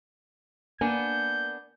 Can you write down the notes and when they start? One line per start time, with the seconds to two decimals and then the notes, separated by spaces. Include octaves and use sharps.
0.81 A#3 B3 D4 G#5 G6